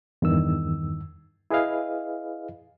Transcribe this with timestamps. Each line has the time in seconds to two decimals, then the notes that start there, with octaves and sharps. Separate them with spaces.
0.22 E2 G2 D#3 E6
1.50 E4 G#4 B4 D#5 F5